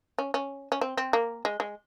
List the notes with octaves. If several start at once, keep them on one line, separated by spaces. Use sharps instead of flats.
C#4
C#4
C#4
C4
C4
A#3
G#3
G#3